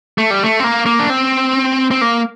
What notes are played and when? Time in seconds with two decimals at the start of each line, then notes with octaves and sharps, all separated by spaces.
0.18 A3
0.31 G3
0.44 A3
0.60 C4
0.64 A#3
0.86 A#3
0.99 D4
1.10 C4
1.91 C4
2.01 A#3